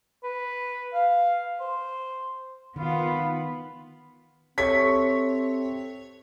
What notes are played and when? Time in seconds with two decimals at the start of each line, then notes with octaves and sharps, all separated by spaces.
0.23 B4
0.93 F5
1.60 C5
2.76 D#3 B3 F4 B5
4.58 C4 G4 A4 C#5 E5 B6